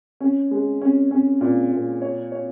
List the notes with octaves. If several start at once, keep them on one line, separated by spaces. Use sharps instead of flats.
C#4
G#3
C#4
C#4
A#2
A#2
C#5
C#5